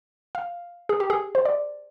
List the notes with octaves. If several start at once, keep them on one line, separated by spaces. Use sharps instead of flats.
F5
G#4
G4
G#4
C5
D5